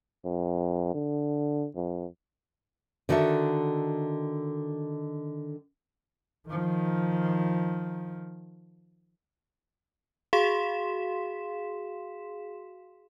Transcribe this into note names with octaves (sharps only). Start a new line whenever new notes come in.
F2
D3
F2
D3 D#3 F#4 A4 E5
D#3 F3
F#4 G#4 F5 C6 B6 E7